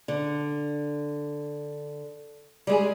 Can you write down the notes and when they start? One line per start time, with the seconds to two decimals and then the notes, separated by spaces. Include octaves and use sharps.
0.08 D3
2.67 G3 G#3 G#4